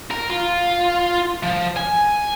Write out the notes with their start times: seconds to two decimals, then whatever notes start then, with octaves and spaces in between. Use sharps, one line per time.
0.11 A#4
0.30 F4
1.43 F3
1.77 G#5